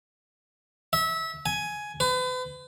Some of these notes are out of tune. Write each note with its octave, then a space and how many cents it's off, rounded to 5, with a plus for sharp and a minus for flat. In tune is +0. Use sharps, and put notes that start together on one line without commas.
E5 -25
G#5 +10
B4 +40